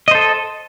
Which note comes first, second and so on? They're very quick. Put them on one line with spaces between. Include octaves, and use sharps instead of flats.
D#5 C5 A4